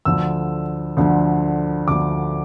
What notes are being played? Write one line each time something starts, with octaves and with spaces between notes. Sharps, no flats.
D2 D3 F3 E6
D2 D3 F3
D2 D3 F3 D6